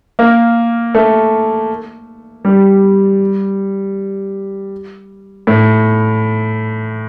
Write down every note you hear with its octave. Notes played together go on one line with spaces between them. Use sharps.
A#3
A3
G3
A2